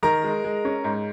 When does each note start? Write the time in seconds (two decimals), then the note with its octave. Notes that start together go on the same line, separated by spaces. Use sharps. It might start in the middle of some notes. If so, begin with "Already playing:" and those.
0.03 D#3 A#4 A#5
0.24 G#3
0.44 G#3
0.65 C#4
0.84 G#2